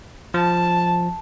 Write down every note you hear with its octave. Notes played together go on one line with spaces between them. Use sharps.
F3 A5